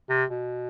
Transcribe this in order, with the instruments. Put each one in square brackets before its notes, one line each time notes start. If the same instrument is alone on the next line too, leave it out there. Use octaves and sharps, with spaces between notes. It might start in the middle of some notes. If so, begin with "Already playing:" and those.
[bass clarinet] C3
B2